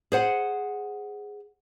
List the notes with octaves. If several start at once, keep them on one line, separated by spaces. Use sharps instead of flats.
G#4 C5 F#5